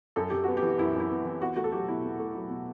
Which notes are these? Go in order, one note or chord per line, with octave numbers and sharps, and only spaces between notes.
F#2 A4
F#2 G4
B3 F#4
G4
E3
F#2 E4
F#2 E4
B3
E3
E2 F#4
A3 F#4
A4
F#3 G4
B2 E4
E2
A3
F#3
B2